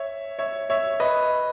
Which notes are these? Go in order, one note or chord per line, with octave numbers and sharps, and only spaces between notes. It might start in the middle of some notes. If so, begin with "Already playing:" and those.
Already playing: C#5 E5
C#5 E5
C#5 E5
B4 D#5